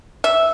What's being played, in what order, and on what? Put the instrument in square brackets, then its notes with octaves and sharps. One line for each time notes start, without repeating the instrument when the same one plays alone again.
[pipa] E5